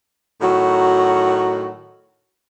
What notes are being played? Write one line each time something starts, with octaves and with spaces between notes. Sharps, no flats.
A2 D#3 F#3 F#4